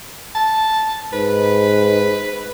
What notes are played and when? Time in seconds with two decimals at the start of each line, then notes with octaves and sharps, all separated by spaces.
0.35 A5
1.13 G#2 B4